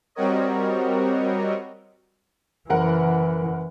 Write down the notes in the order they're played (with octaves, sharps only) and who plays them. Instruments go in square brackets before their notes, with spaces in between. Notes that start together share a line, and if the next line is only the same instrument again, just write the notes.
[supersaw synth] G3 C4 F#4 A#4 C#5 D#5
[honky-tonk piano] F#1 A#4 F#5 [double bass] E3